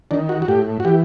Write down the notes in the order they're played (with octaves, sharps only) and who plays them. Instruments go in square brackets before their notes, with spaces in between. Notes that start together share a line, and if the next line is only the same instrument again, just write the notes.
[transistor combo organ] D#3 D4
F#4
F#4
A2 G4
F#4
E3 G4